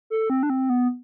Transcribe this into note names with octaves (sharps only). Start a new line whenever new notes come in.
A4
C4
D4
C4
B3